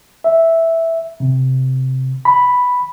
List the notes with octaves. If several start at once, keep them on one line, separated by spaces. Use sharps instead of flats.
E5
C3
B5